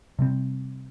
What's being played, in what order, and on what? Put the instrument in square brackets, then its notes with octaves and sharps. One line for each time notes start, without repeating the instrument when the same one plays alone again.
[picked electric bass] C3 G3 C4